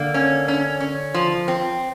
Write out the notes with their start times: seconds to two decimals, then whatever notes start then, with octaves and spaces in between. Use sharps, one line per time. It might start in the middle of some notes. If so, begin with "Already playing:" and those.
Already playing: D3 A#3
0.14 C#4
0.48 C#4
0.80 C#4
1.14 F3
1.48 C4